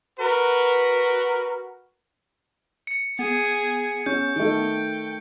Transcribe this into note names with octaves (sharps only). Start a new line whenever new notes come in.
F#4 A#4 B4
C#7
B3 G#4
C#4 G6
D#3 A3 G5